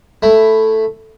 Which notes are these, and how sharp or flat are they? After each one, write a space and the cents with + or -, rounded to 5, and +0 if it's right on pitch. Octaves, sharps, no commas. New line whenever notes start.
A3 +0 E4 +5